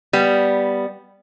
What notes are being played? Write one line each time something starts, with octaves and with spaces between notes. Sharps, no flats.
G3 B3